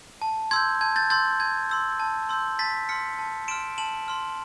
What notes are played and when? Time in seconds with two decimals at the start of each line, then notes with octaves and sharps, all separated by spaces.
0.22 A5
0.51 C6 E6 G6 G#6
0.81 A5 G#6
0.96 G6 A6
1.10 C6 E6 G6 A6
1.40 A5 G#6
1.69 C6 E6 G6
2.00 A5
2.29 C6 E6 G6
2.59 A5 A6 B6
2.89 C6 F6 B6 C#7
3.19 A5
3.48 C6 F6 D7 E7
3.78 A5 E7 F#7
4.08 C6 F6